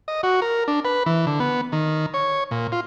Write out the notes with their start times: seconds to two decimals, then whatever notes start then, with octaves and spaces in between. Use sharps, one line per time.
0.08 D#5
0.23 F#4
0.42 A#4
0.68 D4
0.85 B4
1.06 E3
1.27 D3
1.40 B3
1.72 D#3
2.14 C#5
2.51 A#2
2.72 F4